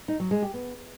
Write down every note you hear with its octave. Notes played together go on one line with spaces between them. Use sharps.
D#4
F#3
G#3
G4
B3